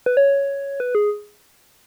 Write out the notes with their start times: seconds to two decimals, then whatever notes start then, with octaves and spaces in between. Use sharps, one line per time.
0.06 B4
0.17 C#5
0.80 B4
0.95 G#4